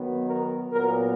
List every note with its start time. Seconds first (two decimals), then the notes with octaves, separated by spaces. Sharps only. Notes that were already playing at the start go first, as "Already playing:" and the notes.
Already playing: D#3 F#3 B3
0.27 A#4
0.72 A#2 F#3 B3 A#4